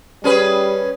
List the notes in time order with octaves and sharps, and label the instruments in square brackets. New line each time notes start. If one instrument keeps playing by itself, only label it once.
[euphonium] G3 [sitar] C#4 G#4 B4